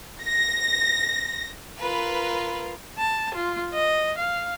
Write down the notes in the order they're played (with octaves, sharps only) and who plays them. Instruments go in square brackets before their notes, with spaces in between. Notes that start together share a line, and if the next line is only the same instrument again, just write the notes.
[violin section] A#6
[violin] F4 A#4 [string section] B4
[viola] A5
F4
D#5
F5